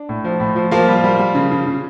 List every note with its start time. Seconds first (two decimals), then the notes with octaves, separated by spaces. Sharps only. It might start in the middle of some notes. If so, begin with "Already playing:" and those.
Already playing: D4
0.09 A2
0.24 F3
0.40 A2
0.56 F3
0.71 F3 A#3 F4
0.88 G3
1.04 G3
1.19 G3
1.35 C#3
1.51 C#3
1.67 C#3